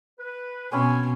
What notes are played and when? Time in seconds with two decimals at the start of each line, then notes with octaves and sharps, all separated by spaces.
0.19 B4
0.72 B2 C4 C#4 G#5 B5